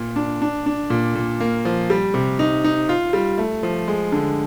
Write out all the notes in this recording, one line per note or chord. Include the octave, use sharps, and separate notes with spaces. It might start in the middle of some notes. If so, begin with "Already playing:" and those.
Already playing: A#2
D4
D4
D4
A#2
A#2
A#3
F3
G3
C3
D#4
D#4
F4
G3
A3
F3
G#3
D3